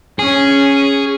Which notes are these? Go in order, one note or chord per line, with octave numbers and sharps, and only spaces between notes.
C#4 G#4